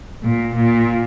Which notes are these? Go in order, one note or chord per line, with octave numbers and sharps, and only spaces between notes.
A#2
A#2